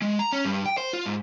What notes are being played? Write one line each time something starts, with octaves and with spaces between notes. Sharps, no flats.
G#3
A#5
C#4
G2
G5
C5
F4
G#2